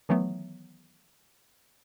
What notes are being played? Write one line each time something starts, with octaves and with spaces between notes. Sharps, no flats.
D#3 E3 F#3 A3 B3